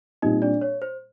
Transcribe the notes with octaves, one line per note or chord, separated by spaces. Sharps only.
A#2 G3 C4 D#4 D#5
D4 D5
C#5
C5